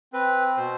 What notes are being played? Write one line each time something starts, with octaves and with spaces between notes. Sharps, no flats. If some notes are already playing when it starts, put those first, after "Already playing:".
C4 B4
B2 C5